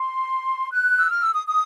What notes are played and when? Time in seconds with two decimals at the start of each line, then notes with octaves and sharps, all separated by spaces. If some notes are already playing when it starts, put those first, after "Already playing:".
Already playing: C6
0.72 F#6
0.98 E6
1.09 F6
1.21 E6
1.35 D#6
1.47 D#6